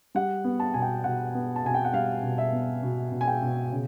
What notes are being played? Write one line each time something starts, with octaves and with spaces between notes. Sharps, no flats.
G3 F#5
B3
A5
B2 G#5
G5
B2 F#5
B3
A5
B2 G#5
G5
F#5
G3 F5
B2
E5
B3
B2
B2
G#5
G5
B2
C#3